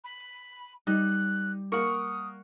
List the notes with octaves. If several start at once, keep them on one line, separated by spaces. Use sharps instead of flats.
B5
G3 D#4 F#6
A#3 A#4 F#5 C#6 D#6